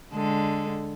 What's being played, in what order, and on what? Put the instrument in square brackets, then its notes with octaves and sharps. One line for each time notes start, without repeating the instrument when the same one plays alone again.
[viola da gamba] D3 G#3 A4